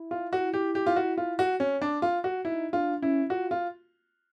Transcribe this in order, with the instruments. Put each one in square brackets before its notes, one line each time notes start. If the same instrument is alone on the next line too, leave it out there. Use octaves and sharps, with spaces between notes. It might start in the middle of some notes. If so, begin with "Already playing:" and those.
Already playing: [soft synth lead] E4
[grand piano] F4
F#4
G4
G4
F4
F#4
F4
F#4
C#4
D4
F4
F#4
[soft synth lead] D#4 [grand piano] E4
[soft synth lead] D4 [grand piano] F4
[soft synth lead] C#4 [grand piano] E4
[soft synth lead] F4 [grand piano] F#4
[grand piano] F4